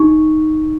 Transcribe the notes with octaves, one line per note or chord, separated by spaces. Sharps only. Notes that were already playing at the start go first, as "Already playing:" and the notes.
Already playing: D#4 C#6